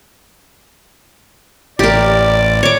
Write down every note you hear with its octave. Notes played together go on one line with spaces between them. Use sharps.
A1 G4 A#4 D5
C#5 D6